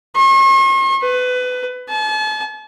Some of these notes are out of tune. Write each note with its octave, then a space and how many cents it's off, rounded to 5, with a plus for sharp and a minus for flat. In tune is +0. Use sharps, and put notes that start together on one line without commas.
C#6 -45
B4 +25
A5 -40